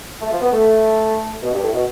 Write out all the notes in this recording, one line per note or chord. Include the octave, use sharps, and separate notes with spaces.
A3
F3
B3
A3
B2
G2
A2
B2